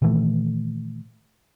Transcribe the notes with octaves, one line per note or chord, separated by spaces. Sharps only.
A#2 D#3 E3 A3